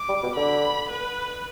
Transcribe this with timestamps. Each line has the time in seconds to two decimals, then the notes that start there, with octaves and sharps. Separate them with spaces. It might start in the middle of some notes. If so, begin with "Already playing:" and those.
Already playing: D6
0.09 G3
0.23 B2
0.36 D3 B5
0.90 B4